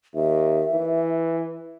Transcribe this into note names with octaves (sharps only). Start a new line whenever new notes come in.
D#2 E5
E3